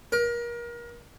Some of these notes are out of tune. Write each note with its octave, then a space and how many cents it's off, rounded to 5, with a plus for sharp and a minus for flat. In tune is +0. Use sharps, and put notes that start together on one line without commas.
A#4 +30